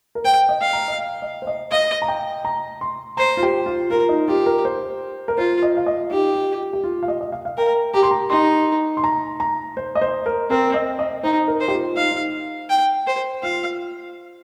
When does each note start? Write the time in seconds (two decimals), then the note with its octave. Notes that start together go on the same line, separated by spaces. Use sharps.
0.15 A#4
0.24 C5 G5
0.49 D#5
0.61 F5
0.73 A#5
0.88 D#5
0.99 F5
1.22 D#5
1.42 C5
1.47 D#5
1.71 D#5 F5
2.02 A#5
2.08 G5
2.45 A#5
2.81 C6
3.17 C5 A#5
3.37 F4
3.43 G4
3.66 F4
3.90 F4 A#4
4.09 D#4
4.28 F4 G4
4.46 A#4
4.65 C5
5.28 A#4
5.38 F4 C5
5.62 D#5
5.77 F5
5.86 D#5
6.11 D#4 G4
6.35 F4
6.73 G4
6.84 F4
7.03 F5
7.08 D#5
7.21 D#5
7.32 F5
7.45 F5
7.57 A#4 G5
7.94 G4 A#5
8.03 C6
8.11 A#5
8.30 D#4 C6
8.97 C6
9.04 A#5
9.40 A#5
9.77 C5
9.95 D#5
10.01 C5
10.26 A#4
10.50 C4 A#4
10.74 D#5
10.99 D#5
11.23 D#4 C5
11.48 A#4
11.60 C5
11.68 G4
11.72 F4
11.97 D#4 F5
12.11 D#4
12.70 G5
13.07 C5
13.43 F4 F5